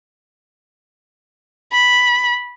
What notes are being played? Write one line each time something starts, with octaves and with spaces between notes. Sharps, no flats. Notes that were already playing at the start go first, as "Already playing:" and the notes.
B5